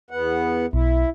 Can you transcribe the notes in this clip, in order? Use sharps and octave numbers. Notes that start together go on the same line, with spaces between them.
E2 B3 F#5
B1 E4